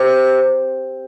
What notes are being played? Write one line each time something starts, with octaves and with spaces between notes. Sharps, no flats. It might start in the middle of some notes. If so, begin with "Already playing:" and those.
Already playing: C3